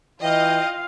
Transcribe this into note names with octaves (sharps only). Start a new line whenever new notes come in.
E3 F4 D#5 F5 G5